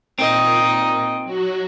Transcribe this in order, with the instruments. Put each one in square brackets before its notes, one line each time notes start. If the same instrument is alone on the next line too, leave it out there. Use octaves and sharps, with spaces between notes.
[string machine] A#2 [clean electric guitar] C4 [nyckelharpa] D#4 D#5
[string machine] F#3 F#4